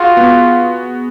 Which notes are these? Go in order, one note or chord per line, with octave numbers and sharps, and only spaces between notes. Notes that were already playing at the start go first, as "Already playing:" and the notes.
Already playing: F4 F#4 G#4
B3